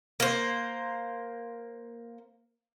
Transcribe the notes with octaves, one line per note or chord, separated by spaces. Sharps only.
A#3 C5